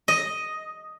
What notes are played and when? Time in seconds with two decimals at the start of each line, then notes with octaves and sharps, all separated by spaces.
0.08 D#5